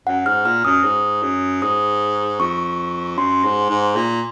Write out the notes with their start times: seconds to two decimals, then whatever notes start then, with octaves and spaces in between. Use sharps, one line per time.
0.07 F#2 F#5
0.25 G#2 F6
0.45 A#2 F6
0.65 F#2 D#6
0.84 G#2
1.22 F#2
1.62 G#2 D#6
2.40 F2 C#6
3.17 F#2 C6
3.44 G#2
3.69 G#2
3.95 A#2